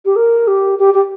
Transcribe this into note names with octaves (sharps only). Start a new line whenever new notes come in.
G4
A#4
G4
G4
G4